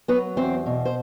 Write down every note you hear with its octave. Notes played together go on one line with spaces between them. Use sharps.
F#3 B3 B4
E2 C4 C5
B2
C5